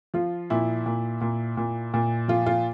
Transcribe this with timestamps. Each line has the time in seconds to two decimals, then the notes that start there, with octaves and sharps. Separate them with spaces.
0.14 F3 F4
0.50 A#2 E4
0.86 A#2
1.21 A#2
1.57 A#2
1.94 A#2
2.28 F3 F4
2.46 F4